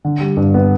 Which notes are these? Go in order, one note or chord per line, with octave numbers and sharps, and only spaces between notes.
D3
G3
G2
B3